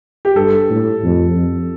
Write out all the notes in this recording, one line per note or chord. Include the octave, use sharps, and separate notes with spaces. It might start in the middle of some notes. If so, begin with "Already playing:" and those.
G4
G2 A4
A2
F2
F2